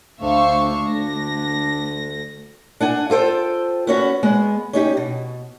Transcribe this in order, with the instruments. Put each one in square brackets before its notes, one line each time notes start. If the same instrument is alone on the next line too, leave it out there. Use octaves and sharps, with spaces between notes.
[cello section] D2 [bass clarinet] D4 [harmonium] A4 C5 [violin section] E5 F5 C#6
[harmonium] D2 D3 [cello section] A3 [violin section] A#6
[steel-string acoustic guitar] D4 F#5 G#5
F4 A4 C5 G5
B3 C#4 F#4
G#3 B3
C#4 D#4 G4
B2